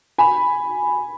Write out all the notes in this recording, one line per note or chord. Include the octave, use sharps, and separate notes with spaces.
G#5 B5